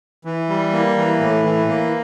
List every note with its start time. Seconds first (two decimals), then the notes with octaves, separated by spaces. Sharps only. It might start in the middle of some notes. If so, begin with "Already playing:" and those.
0.25 E3
0.49 G3
0.73 A#3
0.97 E3
1.20 A2
1.45 E3
1.68 A#3